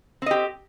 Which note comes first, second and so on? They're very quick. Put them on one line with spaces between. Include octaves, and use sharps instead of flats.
C4 D#5 G4